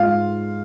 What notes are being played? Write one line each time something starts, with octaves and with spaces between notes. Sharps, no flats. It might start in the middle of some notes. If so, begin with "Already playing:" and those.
Already playing: G#2 F4 F5